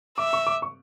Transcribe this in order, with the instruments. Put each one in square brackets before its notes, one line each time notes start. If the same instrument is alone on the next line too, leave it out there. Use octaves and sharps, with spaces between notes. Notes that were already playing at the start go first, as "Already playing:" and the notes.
[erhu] E5 [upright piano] D6
[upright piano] C#6
D6
C#6